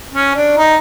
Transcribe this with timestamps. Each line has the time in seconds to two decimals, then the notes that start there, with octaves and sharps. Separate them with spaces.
0.14 C#4
0.35 D4
0.57 D#4